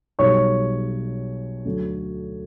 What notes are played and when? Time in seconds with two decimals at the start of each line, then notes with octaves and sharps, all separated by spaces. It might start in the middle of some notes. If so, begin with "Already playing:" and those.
0.19 B1 B2 G3 C#5 C#6
1.65 D2 D3 F#3 A3